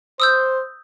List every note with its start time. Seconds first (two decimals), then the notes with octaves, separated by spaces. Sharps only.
0.20 C5 D#6 E6 G6